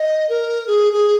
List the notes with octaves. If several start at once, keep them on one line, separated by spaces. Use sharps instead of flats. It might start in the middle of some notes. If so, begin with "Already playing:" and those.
Already playing: D#5
A#4
G#4
G#4